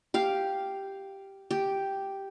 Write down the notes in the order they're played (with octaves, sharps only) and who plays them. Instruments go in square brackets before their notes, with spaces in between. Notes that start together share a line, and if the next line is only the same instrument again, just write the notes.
[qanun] G4 F5
G4